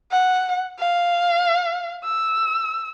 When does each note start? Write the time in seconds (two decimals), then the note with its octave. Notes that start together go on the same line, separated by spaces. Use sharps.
0.12 F#5
0.79 F5
2.04 E6